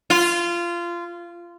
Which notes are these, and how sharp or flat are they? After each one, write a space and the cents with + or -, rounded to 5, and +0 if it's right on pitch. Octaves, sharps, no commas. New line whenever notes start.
F4 -20